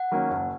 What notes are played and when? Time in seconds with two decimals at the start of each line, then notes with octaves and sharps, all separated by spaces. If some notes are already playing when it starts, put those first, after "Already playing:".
Already playing: F#5
0.12 D#3 F#3 A#3 C#4
0.30 F#1